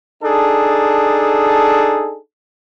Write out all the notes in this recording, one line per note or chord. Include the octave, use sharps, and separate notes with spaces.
D4 D#4 G#4 A4